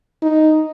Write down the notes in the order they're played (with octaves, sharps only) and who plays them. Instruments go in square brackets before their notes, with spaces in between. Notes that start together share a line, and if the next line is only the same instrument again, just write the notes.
[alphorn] D#4